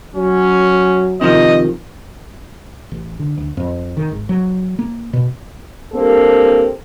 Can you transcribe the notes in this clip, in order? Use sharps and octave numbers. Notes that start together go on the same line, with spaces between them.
F#3 C#4
C3 D#3 F3 D#5
A1
D3
D2
F2
D#3
G#1
F#3
A#3
B2
G2 A#3 C4 G4 A4